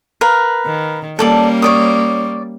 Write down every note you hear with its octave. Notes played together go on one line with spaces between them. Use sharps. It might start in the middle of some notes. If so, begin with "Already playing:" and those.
A#4 B4 F5
D#3
G3 A#3 C#4 A4 D5 A5
C#5 D5 D#6